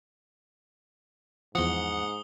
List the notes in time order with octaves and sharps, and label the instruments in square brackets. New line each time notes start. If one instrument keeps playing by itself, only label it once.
[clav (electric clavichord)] E2 F3 [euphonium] G#2 [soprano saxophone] F#5 [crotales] D#6 G7